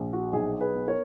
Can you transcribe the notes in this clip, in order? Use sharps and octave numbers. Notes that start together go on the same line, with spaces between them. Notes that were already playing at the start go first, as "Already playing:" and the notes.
Already playing: A#1
F#4
B1 G#4
G#4 B4
B3
A#4 C#5